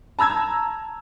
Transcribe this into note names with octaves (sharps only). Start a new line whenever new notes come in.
A5 A#5 E6 G#6